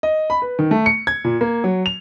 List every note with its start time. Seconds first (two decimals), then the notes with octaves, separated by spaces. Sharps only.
0.03 D#5
0.30 B5
0.42 B4
0.59 D#3
0.71 A3
0.86 C#7
1.07 G#6
1.24 A#2
1.41 A#3
1.64 F#3
1.86 F7